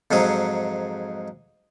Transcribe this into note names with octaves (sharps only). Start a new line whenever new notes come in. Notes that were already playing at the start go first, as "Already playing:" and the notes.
F2 G#2 F#3 G#4